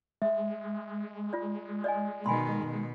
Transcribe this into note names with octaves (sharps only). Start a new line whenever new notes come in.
G#3 E5
F4 D5
D5 D#5 G#5
B2 D#3 G#5 B5 C6
B2